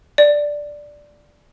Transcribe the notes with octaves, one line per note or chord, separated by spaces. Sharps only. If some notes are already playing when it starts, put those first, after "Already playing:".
D5